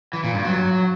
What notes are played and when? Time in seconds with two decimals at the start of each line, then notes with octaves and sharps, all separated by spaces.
0.13 E3
0.24 A#2
0.34 G2
0.45 F#3